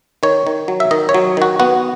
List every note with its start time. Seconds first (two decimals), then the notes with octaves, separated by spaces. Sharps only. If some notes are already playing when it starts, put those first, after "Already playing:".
0.23 D#3 C#5
0.47 D#3
0.68 F#3
0.80 E5
0.91 D#3 D#5
1.09 C#5
1.14 F#3
1.37 D#3 F#4
1.60 B3 F#4